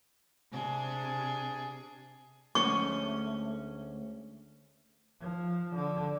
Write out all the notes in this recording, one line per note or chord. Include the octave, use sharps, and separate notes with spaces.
C3 D4 G#4
D2 G#3 A3 C#4 C#6
F3
D3